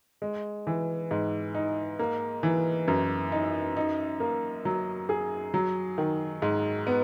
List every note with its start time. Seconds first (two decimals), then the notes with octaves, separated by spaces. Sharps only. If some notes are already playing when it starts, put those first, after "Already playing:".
0.22 G#3
0.67 E3
1.11 G#2
1.54 D#4
1.99 A#3
2.43 E3
2.88 F#2
3.32 D#4
3.77 D#4
4.20 A#3
4.65 F#3
5.09 G#4
5.54 F#3
5.98 D#3
6.42 G#2
6.87 B3